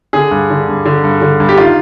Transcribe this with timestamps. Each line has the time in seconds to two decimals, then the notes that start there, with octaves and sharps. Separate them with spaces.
0.13 D3 G#4
0.31 G2
0.50 D3
0.68 G2
0.86 D3
1.04 G2
1.22 D3
1.40 G2
1.49 G4
1.58 D#3 F4